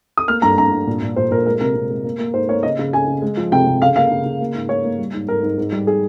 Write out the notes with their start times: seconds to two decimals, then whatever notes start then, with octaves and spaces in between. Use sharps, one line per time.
0.17 D#6
0.28 A#3 F6
0.42 G2 A#5
0.58 G2 A#5
0.72 G2
0.87 A#2
1.02 A#2
1.16 A#2 C5
1.31 A#2 A#4
1.46 G#3 A#4
1.61 C3 A#4
1.76 C3
1.90 G#3
2.04 A#3
2.19 A#3
2.33 G#2 C5
2.49 A#3 C#5
2.63 C#3 D#5
2.79 C#3
2.93 C#3 G#5
3.07 C#3
3.22 G#3
3.37 F3
3.52 C3 G5
3.66 C3
3.81 C#3 F5
3.96 A#3 F5
4.11 C#3
4.26 C#3
4.40 A#3
4.54 G#2
4.69 A#3 C#5
4.84 A#3
4.99 G3
5.14 G#2
5.28 G#2 A#4
5.43 G#2
5.58 G#2
5.72 G3
5.87 G#4